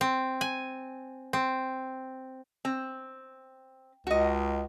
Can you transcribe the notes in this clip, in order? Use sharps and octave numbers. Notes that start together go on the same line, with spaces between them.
C4
G#5
C4
C4
C#2 F#4 D#5